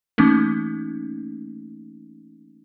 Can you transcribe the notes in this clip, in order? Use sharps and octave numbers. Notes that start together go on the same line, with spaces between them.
E3 A3 A#3 C#4 D#4